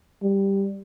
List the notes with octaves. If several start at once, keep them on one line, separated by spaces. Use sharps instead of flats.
G3